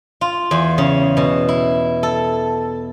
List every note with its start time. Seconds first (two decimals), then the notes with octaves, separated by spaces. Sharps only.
0.21 F4
0.51 E2
0.78 C#3
1.17 B2
1.48 E4
2.03 A4